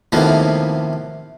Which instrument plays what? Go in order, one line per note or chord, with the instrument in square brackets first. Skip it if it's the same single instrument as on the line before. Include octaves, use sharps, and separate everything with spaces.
[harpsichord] D#2 A2 C3 F3 B3